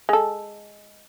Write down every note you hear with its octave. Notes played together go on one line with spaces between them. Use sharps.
G#3 A4